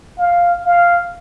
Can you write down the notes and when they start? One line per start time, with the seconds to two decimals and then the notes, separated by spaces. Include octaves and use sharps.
0.18 F5
0.65 F5